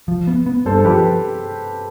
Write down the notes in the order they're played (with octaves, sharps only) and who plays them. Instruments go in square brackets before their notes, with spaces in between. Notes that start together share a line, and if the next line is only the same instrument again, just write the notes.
[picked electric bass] F3
B3
B3
[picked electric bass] G2 [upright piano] A4 C5
[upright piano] A4
[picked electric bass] F3 [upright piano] G4 B4